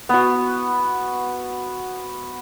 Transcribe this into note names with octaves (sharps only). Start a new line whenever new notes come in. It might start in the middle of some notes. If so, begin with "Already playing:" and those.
B3 F#4